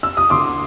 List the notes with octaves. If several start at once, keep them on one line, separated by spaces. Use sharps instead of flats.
E6
D#6
D2 C6 D6